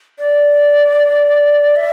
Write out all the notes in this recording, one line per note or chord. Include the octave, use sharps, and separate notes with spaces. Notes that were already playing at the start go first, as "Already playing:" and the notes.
D5
E5